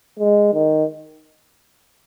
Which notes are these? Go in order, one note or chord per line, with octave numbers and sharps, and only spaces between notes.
G#3
D#3